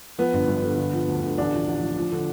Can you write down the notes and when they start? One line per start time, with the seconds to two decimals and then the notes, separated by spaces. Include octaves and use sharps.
0.18 F3 B3
0.33 G1
0.48 G2
0.63 D3
0.77 D3
0.93 F3
1.08 D2
1.22 D2
1.38 A1 D4
1.52 F3
1.67 A1
1.82 F3
1.97 F3
2.12 D3